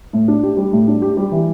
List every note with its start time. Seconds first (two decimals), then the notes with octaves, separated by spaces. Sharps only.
0.13 A2
0.28 D4
0.43 G4
0.57 G3
0.73 A2
0.87 D4
1.02 G4
1.17 G3
1.32 E3